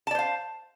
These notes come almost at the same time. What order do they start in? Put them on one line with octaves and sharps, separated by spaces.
A5 D5 C5 F5